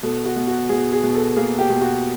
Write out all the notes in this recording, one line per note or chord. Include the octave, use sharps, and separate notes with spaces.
B2 A4
F#4
B2
F#4
B2 G#4
G#4
B2
A4
A#3 G#4
G4
B2
F#4